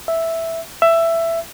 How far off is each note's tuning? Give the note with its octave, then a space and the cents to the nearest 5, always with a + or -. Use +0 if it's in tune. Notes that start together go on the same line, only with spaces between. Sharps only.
E5 +0
E5 +15